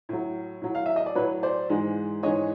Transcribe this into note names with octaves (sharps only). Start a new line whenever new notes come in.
A2 F#3
A2 F#3
F5
E5
D#5
D5
A2 F#3 B4 C#5
C5 D5
G#2 E3 G#3
G#2 E3 G#3 C#5 D#5